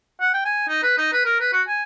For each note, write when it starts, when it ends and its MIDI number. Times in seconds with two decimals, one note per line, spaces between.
0.21 0.32 78
0.34 0.44 79
0.45 0.63 80
0.68 0.79 63
0.82 0.95 71
0.98 1.10 63
1.13 1.22 71
1.25 1.40 70
1.40 1.51 71
1.53 1.62 66
1.67 1.83 80